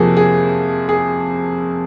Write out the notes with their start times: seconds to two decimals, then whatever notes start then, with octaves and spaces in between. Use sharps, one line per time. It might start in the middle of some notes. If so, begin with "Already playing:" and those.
Already playing: F2 C3 F3 A#3 F#4 G#4
0.17 G#4
0.89 G#4